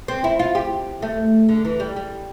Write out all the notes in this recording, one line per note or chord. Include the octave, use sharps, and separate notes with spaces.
C4
E4
F4
G4
A3
D3
E3
G3
G3